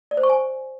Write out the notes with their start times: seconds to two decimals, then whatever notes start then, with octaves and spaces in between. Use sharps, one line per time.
0.11 D5
0.17 C5
0.23 C#6
0.29 G#5